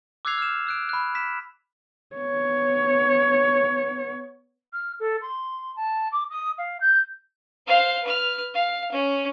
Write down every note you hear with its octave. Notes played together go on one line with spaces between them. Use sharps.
D6 E6 F#6 G#6 C7 F7
F6 E7
E6 F#6 D7
B5 F#6
B6 E7
B3 C#5
F6
A4
C6
A5
D6
D#6
F5
G6
C5 F5
B4 F6
F5
C#4